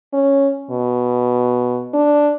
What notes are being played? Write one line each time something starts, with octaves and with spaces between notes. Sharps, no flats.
C#4
B2
D4